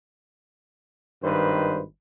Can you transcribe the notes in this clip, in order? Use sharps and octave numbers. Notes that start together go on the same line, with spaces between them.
G#1 G2 D#3 B4 C5